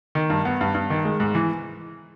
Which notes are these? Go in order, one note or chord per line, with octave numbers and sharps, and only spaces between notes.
D#3
G2
B3
G2
G2
D#3
G#3
G#2
E3